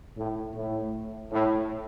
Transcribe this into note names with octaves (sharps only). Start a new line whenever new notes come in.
A2
A2
A2